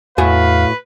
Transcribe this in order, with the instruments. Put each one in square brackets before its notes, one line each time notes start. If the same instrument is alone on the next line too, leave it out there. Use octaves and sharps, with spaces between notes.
[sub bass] E2 [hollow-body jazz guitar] A2 F#4 G#5 [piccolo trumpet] B4 [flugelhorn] F5